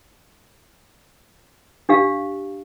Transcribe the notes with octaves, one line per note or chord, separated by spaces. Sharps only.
D4 G4 F5